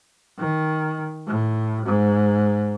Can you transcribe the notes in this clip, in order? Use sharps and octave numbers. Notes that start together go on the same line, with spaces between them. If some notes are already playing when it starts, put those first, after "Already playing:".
D#3
A2
G#2